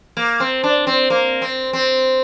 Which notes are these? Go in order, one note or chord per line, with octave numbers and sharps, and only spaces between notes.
A#3
C4
D4
C4
A#3
C4
C4